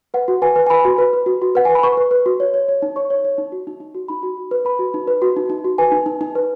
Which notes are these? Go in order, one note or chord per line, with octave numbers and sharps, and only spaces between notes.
B4 F#5
F#4
B4 G#5
B4
G#5
B4 B5
F#4
B4
B4
F#4
F#4
B4 F#5
B4 G#5
B5
B4 C#6
B4
B4
F#4
C#5
C#5
C#5
D#4
C#5 C#6
C#5
C#5
D#4
F#4
D#4
D#4
F#4
D#4 B5
F#4
F#4
B4
B4 B5
F#4
D#4
B4
F#4
D#4
D#4
F#4
B4 G#5
D#4
D#4
D#4
B4